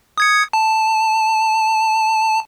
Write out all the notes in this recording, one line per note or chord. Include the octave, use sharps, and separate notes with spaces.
D#6 G#6 C#7
A5